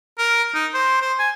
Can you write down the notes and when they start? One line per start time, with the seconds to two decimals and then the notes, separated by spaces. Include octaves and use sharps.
0.19 A#4
0.54 D#4
0.74 C5
1.02 C5
1.19 G#5